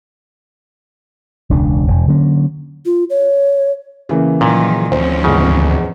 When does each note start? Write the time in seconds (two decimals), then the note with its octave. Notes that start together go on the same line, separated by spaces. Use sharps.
1.50 E1 C#2 D4
1.87 E1
2.07 D3 F#3 A#3 C#4
2.86 F4
3.10 C#5
4.09 C#3 E3 A#3
4.41 A#2 D#3 F3 F#3
4.92 D2 F3 C4 C#4 C5
5.24 E2 G#2 C#3